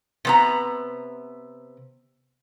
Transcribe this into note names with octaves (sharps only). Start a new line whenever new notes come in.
C3 B3 A#5